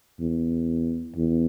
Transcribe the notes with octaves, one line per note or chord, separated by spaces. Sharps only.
E2
E2